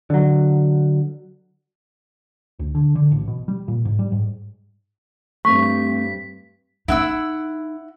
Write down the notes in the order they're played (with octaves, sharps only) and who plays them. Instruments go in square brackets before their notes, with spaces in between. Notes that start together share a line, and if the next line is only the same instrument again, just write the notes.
[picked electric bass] D3 F#3
D2
D3
D3
A1
B2
G3
A#2
G#2
G3
G#2
[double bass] G2 [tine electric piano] A3 C4 [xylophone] C#6 [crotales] B6
[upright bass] D#4 [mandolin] E4 F#5 E6